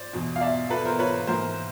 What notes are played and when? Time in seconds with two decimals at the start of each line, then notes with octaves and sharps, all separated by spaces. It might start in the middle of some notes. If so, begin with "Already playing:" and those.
Already playing: C5 D5
0.13 E2 B2
0.36 F5
0.41 D5 E5
0.70 A4 B4
0.85 A#4 C5
0.99 B4 C#5
1.27 G#2 E3 A#4 C5